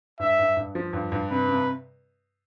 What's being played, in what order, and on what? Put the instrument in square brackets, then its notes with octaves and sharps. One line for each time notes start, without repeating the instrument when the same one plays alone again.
[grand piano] G2 [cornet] E5
[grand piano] G2
G2
F3
G2
G2
[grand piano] C3 [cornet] B4
[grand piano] C3